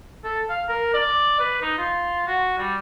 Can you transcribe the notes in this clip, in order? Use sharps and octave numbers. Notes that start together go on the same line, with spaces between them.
A4
F5
A#4
D5
B4
D#4
F4
F#4
G3